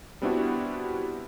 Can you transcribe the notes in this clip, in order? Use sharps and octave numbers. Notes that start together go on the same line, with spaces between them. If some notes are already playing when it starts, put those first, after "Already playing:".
G3 B3 C4 D4 E4 F#4